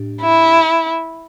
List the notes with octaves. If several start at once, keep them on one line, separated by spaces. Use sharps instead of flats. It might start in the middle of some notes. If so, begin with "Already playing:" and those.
Already playing: A2 D4 G4
E4